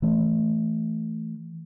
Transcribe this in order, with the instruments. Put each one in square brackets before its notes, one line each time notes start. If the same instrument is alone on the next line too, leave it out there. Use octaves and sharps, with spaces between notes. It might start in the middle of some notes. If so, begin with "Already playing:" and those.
[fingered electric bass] E3 A3